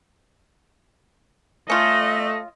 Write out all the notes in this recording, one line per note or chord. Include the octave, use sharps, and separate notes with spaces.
A3 C#4 F4 D#5